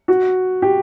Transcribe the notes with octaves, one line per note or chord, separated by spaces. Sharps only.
F#4
G4